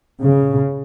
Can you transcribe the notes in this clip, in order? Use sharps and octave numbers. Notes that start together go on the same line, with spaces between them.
C#3